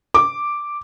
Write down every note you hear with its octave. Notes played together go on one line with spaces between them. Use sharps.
D6